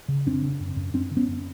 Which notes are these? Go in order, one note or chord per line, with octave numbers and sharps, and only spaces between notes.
C#3
F#2 C4 D4
C#3
F#2
F#2
F#2 C4 D4
D3
B3 C#4
F#2